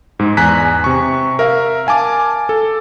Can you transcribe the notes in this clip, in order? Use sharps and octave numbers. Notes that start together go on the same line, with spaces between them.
G#2 G#3
E2 G#5 A#5 F#6 B6
C3 C#6
A#4 E5 F5
F5 G#5 A5 D6
A4